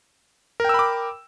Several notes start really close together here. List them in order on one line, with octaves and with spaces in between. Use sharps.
A#4 G5 E6 B5 D6